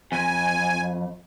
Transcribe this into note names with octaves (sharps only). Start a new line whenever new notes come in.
F2 G#5